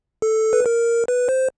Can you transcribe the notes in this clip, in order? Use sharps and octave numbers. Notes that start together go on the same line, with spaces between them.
A4
B4
A#4
B4
C5